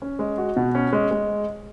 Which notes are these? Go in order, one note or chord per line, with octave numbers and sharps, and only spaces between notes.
C#4
G#3
F#4
B2
C#4
G#3
G#3